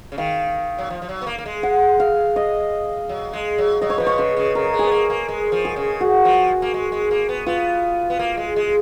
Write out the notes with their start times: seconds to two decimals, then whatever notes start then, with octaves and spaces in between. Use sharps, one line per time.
0.12 C#3
0.18 D#3 F5
0.79 F#3
0.90 F3
1.02 F3
1.09 F#3
1.22 B3
1.27 A#3
1.38 A#3
1.46 G#3
1.63 F#5
2.00 F5
2.36 D#5
3.09 F#3
3.33 G#3
3.58 F#3
3.81 F#3 D#5
3.90 C#5
3.98 F3 B4
4.07 C#5
4.18 C#3 B4
4.37 C#3
4.55 C#3 A#4
4.73 G#3
4.79 B3 G#4
4.91 A#3
5.10 A#3
5.28 G#3
5.52 F3
5.65 G#4
5.76 C#3
6.01 F#4
6.25 F3
6.62 A#3
6.74 G#3
6.92 G#3
7.11 A#3
7.29 B3
7.46 B3 F4
8.10 B3
8.19 A#3
8.37 G#3
8.56 G#3